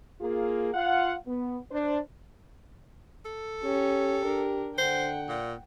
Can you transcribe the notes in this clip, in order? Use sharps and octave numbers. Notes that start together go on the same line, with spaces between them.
A#3 F4 G#4
F4 F5 F#5
B3
D4 C5
A4
C#4 G4 C#5
D4 A#4
D3 C5 F#5 G5
A#2